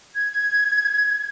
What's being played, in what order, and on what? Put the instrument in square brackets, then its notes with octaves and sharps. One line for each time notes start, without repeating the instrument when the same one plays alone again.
[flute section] G#6